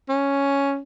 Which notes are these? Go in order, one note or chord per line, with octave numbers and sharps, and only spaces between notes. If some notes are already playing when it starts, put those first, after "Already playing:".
C#4